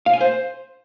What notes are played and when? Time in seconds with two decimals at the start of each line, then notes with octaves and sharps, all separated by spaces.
0.06 F5
0.13 G#5
0.21 C5